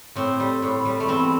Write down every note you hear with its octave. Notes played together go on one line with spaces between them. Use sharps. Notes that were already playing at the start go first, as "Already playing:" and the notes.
A2 C4
G3
A2
G3
A3
E2 C4